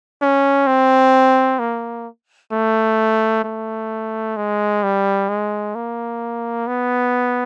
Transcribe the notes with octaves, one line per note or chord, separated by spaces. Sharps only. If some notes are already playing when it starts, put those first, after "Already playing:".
C#4
C4
A#3
A3
A3
G#3
G3
G#3
A#3
B3